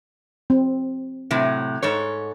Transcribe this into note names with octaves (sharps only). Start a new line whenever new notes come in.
C4
A2 C3 F#3
G#2 A4 C#5